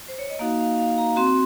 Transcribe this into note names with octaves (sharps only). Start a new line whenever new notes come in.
C5
C#5
D#5
A#3 D#4 F#4 F5
F5
F5
A#5
C4 F#4 C6